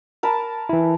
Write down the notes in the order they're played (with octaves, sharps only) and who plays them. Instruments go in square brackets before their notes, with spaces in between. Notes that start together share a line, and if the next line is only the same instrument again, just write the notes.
[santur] A#4 A5 B5
[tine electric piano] E3 E4